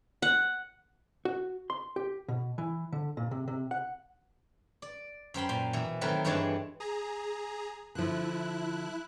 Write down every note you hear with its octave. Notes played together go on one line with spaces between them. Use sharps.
F#5
F#4
C6
G4
B2
E3
D3
A#2
C3
C3
F#5
D5
F#2 C5 G5 B5
A#2 C6
B2 E3
D#3 F#3 A3 C4 A#4 B4
G2 E3 G#3 D4 C#5 A5
G#4 A#5
D3 F3 E4 F#6